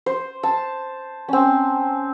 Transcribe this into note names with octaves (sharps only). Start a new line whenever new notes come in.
C5
A5
C4 C#4